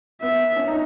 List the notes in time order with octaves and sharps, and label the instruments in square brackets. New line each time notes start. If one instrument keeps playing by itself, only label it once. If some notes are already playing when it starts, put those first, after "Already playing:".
[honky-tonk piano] B3 [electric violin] E5
[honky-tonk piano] C#4
D#4